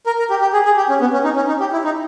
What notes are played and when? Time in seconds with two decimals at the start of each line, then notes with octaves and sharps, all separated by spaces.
0.06 A#4
0.19 A#4
0.30 G4
0.41 G4
0.53 G#4
0.65 G#4
0.77 G4
0.89 C#4
1.01 B3
1.13 C#4
1.24 D#4
1.36 C#4
1.48 D#4
1.60 G4
1.72 E4
1.84 D#4